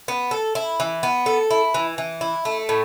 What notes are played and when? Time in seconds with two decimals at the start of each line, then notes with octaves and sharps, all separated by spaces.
0.08 B3
0.31 A4
0.55 E4
0.80 E3
1.03 B3
1.26 A4
1.51 E4
1.74 E3
1.98 E3
2.21 E4
2.45 A3
2.69 A2